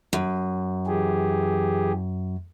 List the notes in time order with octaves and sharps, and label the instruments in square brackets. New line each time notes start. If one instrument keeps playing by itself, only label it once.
[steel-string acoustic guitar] F#2
[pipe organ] E3 G4 G#4